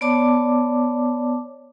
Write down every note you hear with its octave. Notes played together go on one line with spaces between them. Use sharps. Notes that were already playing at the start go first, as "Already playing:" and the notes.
B3 C#5 D5 A5 D6